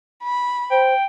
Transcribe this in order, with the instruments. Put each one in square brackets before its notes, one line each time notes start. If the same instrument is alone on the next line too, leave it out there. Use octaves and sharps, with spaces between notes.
[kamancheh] B5
[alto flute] C5 [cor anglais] G5